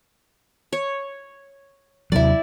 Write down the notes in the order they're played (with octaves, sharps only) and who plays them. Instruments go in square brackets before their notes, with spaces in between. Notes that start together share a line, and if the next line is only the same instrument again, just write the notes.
[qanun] C#5
[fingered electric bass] D#2 C3 F#3 [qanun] E4 D5